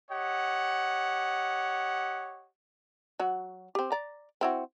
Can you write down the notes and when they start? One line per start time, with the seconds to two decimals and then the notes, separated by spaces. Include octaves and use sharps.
0.11 G4 C#5 D#5 F#5
3.20 F#3 F#4
3.75 C4 G4
3.92 D5 A#5
4.41 C4 E4 F#4